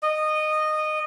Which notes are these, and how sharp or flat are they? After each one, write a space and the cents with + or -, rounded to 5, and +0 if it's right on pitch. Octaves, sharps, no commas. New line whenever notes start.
D#5 -15